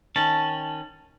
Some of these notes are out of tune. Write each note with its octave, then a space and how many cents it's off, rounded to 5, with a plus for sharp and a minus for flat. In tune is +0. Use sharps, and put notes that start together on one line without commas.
D#3 +0 C#4 -10 A5 +0